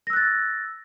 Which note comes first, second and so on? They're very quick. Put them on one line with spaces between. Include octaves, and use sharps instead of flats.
A#6 E6 F#6 A6